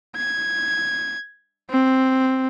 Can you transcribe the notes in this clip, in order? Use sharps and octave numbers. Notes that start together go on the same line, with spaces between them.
G#6
C4